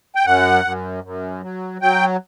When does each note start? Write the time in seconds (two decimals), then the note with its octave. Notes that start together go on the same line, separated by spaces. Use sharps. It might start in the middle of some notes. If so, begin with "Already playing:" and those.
0.15 G5
0.25 F#2 F#5
0.65 F#2
1.04 F#2
1.42 F#3
1.82 F#3 G5